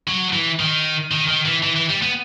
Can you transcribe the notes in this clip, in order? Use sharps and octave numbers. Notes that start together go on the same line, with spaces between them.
F#3
E3
D#3
D#3
D#3
E3
E3
E3
G3
B3